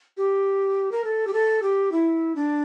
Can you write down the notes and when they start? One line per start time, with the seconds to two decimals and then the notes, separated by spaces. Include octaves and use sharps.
0.17 G4
0.92 A#4
1.04 A4
1.27 G4
1.33 A4
1.62 G4
1.92 E4
2.35 D4